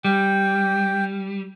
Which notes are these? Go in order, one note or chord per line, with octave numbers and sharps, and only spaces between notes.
G3 G5